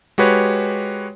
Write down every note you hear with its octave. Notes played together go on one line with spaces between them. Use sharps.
G#3 F#4 G4 B4 C#5